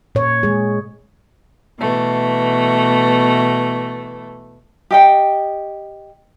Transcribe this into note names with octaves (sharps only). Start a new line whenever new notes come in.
A#2 C#5
G#3 G#4
B2 E3 A3
G4 D#5 G5